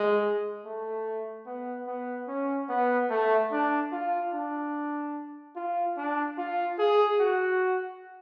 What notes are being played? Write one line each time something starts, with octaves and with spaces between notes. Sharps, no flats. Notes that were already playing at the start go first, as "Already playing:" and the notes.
Already playing: G#3
A3
B3
B3
C#4
B3
A3
D4
F4
D4
F4
D4
F4
G#4
F#4